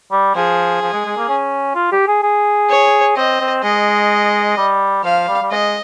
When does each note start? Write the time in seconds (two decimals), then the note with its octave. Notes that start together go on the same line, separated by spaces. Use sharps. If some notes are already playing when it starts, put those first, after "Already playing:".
0.12 G3
0.35 F3 G#4
0.82 F3
0.93 G#3
1.05 G#3
1.17 A#3
1.29 C#4
1.75 F4
1.92 G4
2.08 G#4
2.23 G#4
2.70 C#5
3.17 C4 D#5
3.41 C4
3.63 G#3 D#5
4.57 G3
5.04 F3 F5
5.28 G3
5.42 G3
5.51 G#3 D#5